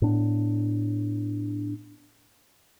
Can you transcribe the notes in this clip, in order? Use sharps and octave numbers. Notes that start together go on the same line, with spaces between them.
A2 B3 D4